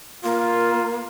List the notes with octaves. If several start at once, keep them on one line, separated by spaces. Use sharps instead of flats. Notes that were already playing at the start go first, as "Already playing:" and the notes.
A#3 F4